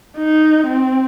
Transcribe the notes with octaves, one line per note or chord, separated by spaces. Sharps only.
D#4
C4